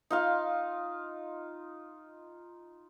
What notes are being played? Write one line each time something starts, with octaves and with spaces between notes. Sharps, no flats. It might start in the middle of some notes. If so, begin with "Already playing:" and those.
D#4 F4 F5